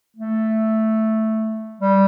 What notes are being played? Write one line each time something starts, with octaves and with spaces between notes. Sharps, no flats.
A3
G3